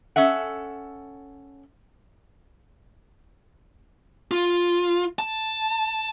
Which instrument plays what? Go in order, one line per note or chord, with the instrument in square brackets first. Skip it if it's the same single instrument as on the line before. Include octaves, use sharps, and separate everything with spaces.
[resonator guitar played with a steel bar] C#4 A4 E5 F#5
[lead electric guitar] F4
A5